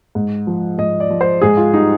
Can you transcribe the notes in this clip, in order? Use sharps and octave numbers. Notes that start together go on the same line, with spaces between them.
G#2
F3
G#2 D#5
D5
F3
C5
G#2 G#4
F4
G3 D#4